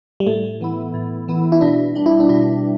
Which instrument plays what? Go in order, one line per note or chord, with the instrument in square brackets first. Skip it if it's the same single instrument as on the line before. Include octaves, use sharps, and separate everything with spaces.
[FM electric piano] G3
[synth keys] A2 [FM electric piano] A3
[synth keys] E3 B3 E4
A2
E3 B3 E4
[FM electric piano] E4
[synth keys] B2 [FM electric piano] D4
[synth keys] G3 D4
[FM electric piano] E4
D4
[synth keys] B2 [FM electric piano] E4